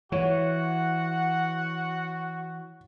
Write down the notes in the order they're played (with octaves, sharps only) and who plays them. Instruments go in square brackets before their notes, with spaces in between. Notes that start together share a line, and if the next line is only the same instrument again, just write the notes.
[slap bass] E3 [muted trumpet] F#4 [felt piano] C#5 [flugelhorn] F#5